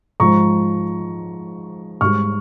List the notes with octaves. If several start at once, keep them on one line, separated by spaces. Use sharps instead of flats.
G#2 F3 G#3 A#5 C#6
G#2 G3 C#6 F6